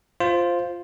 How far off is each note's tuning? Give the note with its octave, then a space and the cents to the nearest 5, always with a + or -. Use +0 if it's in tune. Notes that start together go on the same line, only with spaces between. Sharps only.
F4 +0 C5 +0